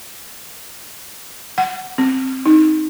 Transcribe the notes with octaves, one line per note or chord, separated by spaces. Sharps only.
F#5
C4
D#4